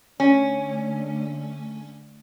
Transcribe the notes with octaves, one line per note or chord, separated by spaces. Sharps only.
D3 A3 C#4